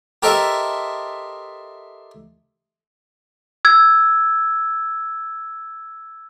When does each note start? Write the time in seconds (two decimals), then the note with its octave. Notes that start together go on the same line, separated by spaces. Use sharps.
0.23 G4 A4 A#4 C5 D#5 E5
3.65 E6 G#6